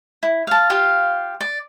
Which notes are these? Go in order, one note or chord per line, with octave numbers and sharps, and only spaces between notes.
E4
F5 A5
F4 G4 F5
D5